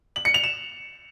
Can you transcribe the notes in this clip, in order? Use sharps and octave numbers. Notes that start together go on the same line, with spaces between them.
F#7
C#7
F7
E7